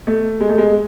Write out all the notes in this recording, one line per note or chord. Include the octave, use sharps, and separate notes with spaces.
A3
G#3
A3
G#3